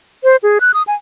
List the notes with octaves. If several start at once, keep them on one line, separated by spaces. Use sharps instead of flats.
C5
G#4
F#6
D#6
G#5